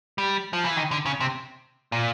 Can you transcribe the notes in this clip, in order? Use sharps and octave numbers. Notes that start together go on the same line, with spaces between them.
G3
F3
E3
D#3
D3
C#3
C3
A#2